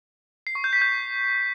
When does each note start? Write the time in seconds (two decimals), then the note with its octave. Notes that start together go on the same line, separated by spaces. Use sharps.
0.47 C7
0.55 C#6
0.64 G6
0.73 B6
0.82 G6